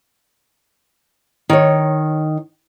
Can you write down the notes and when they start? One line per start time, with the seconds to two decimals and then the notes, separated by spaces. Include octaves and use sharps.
1.50 D#3 C#5